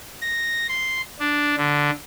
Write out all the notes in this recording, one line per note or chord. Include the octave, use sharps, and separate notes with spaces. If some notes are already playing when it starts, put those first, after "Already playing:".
A#6
C6
D4
D3